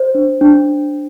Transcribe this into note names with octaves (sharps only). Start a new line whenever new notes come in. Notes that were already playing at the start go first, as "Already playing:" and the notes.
Already playing: C5
D4
D4